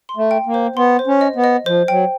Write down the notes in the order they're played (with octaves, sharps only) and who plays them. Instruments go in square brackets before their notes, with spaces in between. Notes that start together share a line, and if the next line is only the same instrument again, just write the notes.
[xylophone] C6
[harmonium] A3
[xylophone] G5
[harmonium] A#3
[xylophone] C5
[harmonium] B3 [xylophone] C6
[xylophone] C5
[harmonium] C#4
[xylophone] D#5
[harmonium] B3
[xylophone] D#5
[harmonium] F3 [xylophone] C5
[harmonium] F#3 [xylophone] G5